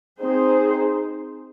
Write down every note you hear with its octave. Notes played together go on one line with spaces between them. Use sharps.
C4 D#4 G#4 C5